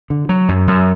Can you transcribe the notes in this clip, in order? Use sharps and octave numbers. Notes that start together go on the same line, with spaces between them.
D3
F#3
F#2
F#2